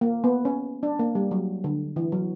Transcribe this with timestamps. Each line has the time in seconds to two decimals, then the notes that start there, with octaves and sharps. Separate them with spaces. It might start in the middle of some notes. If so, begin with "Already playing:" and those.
0.01 A#3
0.24 B3
0.45 C#4
0.83 D4
0.99 A#3
1.15 G3
1.31 F#3
1.64 D3
1.96 E3
2.12 F#3